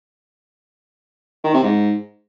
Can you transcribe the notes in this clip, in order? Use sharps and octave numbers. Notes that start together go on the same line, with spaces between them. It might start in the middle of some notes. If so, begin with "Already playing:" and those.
D#3
C3
G#2